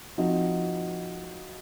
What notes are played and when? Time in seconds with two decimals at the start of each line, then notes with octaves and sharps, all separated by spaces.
0.18 F3 C4 D#4 F#4